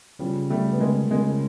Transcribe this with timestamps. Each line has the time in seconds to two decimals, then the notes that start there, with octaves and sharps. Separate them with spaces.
0.19 C#3 F3 G3
0.50 G3 A3
0.72 B3
0.80 G#3 A#3
1.11 C#3 G#3 A#3